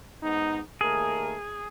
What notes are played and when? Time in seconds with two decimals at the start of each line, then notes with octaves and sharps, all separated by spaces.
0.22 G#2 B3 D#4
0.81 D#2 A3 G#4 A#4